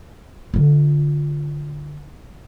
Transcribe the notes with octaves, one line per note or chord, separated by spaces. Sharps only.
D3 F4